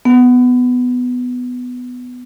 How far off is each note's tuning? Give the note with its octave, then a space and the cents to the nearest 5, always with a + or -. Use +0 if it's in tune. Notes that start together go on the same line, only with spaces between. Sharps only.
B3 +10